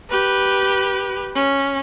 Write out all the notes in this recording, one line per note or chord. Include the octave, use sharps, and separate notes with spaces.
G4 B4
C#4